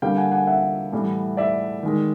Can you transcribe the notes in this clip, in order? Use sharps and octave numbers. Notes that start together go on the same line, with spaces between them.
D3 G3 A#3 F5 G5
F#5 G#5
F#5 G#5
E5 F#5
A2 E3 G3
D5 E5
D#3 G#3